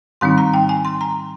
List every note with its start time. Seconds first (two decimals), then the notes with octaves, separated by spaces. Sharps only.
0.21 G#2 D#3 G3 C4 D#4 C6
0.38 A#5
0.54 G5
0.69 G#5
0.85 C6
1.01 A#5